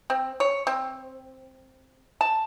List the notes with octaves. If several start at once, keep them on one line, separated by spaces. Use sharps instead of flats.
C4
C#5
C4
A5